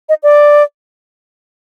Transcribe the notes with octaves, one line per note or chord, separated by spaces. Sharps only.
D#5
D5